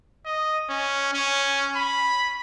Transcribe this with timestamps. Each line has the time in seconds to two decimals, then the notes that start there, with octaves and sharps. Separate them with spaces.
0.25 D#5
0.69 C#4
1.13 C#4
1.75 B5